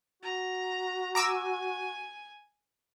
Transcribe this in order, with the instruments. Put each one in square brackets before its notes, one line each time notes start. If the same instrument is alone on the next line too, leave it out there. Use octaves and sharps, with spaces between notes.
[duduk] F#4 [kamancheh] A#5
[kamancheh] G#5 [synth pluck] A#5 D6 E6